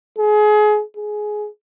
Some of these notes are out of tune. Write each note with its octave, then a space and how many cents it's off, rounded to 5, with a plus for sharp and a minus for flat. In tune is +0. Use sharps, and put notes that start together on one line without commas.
G#4 +30
G#4 +15